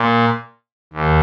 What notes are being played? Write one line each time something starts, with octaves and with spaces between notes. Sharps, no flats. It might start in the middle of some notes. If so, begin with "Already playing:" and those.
Already playing: A#2
D#2